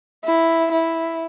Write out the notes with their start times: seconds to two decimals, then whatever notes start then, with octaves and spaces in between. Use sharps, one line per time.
0.25 E4
0.72 E4